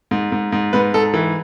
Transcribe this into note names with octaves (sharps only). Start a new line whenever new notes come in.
G#2
G#2
G#2
G#2 B4
G#2 A4
E3